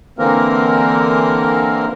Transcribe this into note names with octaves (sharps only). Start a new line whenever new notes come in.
D3 E3 A#3 C4 A#4